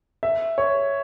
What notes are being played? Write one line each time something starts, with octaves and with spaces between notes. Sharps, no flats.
E5
C#5